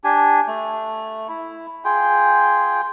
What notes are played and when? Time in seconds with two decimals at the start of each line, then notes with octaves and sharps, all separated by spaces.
0.04 D4 G4 G#5
0.48 A3
1.28 E4
1.85 F4 G#4 G5